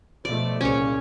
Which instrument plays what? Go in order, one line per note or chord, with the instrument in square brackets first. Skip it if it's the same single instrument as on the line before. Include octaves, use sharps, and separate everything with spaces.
[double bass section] B2 F3 A3 [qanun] D5
[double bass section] C2 A#2 C#3 [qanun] C#4 C#5